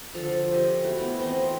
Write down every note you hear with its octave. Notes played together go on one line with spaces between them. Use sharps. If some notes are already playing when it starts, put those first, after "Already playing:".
D3 F3 A4 A5
G4 D#5 G#5
A3 E4 F#4
B3 G5
E3 C4 C5 D#5